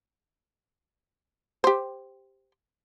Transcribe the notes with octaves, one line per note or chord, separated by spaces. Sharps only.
G4 C5